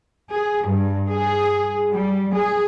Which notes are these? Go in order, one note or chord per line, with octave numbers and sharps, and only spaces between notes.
G#4
G2
G#4
G3
G#4